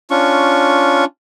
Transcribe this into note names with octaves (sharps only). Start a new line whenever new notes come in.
C#4 D4 F4 C#6